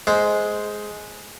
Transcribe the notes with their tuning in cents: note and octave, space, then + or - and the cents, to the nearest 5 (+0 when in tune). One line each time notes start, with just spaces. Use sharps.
G#3 +10 C5 -5